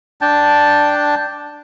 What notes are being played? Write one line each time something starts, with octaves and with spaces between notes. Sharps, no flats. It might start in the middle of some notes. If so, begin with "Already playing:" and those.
D4 G5 A5